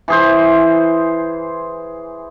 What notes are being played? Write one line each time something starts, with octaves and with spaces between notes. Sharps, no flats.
E3 G#4 C5